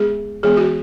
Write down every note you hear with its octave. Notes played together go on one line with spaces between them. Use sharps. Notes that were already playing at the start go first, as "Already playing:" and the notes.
Already playing: G#3 B3 D4 G#4
E3 G#3 B3 G#4
F#4